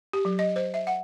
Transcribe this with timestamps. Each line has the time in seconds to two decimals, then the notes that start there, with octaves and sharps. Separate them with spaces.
0.13 G4
0.25 F#3
0.39 D#5
0.56 C5
0.74 E5
0.87 F#5